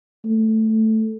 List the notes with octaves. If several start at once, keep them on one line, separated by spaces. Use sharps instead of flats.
A3